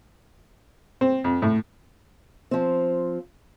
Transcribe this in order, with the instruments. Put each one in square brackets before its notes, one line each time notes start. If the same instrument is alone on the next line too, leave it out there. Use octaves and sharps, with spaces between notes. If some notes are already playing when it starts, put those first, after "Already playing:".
[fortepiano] C4
F2
A2
[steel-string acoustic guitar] F3 C4